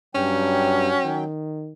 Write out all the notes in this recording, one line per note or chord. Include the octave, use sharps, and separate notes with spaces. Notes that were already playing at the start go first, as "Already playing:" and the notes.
G2 F#3 C#4 G5
D#3